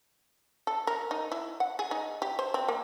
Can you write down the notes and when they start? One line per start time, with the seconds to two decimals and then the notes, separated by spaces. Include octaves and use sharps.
0.67 A4
0.87 A#4
1.11 D#4
1.32 E4
1.60 F#5
1.79 G#4
1.91 D#4
2.22 G4
2.39 C5
2.54 C4
2.68 A#3